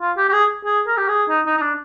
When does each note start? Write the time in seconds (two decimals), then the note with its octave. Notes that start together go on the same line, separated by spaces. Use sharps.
0.01 F4
0.17 G4
0.29 G4
0.33 G#4
0.65 G#4
0.87 A#4
0.97 G4
1.08 G#4
1.29 D#4
1.46 D#4
1.57 D#4
1.62 D4